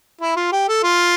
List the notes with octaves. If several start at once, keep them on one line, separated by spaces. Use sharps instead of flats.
E4
F4
G4
A4
F4